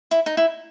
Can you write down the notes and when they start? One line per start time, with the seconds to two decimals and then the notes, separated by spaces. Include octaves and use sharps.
0.11 E4
0.26 D#4
0.37 E4